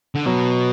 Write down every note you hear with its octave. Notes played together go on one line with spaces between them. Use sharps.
D3
B2 F#3